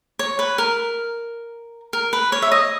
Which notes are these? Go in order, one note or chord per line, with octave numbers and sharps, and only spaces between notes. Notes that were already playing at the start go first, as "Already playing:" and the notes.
C#5
B4
A#4
A#4
B4
C#5
E5
D#5